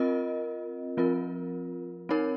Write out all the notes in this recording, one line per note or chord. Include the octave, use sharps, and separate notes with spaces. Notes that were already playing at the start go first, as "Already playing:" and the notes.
Already playing: C4 F4 A#4 D#5
F3 C4 F4 A#4
C4 D#4 A#4 C#5